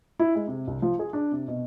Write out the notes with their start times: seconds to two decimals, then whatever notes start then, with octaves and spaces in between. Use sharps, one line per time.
0.19 E4
0.35 G#3
0.48 C3
0.67 C2
0.82 F3
0.99 G#4
1.13 D4
1.31 C3
1.48 B2